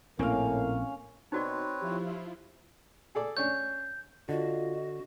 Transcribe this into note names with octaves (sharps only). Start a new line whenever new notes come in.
A#1 A2 A#3 C4 C#4 A#4 F5
B2 C4 D#4 F#4 B4 C#5 D5
F3 E4 F4 G4
G#4 A4 D5
C#4 D4 C#5 G6
D3 F4 F#4 D#5